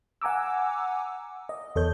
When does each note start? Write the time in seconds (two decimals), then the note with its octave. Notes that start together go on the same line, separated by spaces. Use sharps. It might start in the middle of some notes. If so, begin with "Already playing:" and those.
0.22 F#5 G#5 A#5 D6 E6
1.49 D#5
1.76 E2 A4 C#5 G6